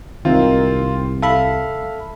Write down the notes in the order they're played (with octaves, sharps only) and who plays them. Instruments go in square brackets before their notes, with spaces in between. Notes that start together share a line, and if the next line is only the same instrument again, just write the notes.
[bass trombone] C2 [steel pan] D#3 [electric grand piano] C4 F4
[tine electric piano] A4 E5 B5 [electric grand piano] F5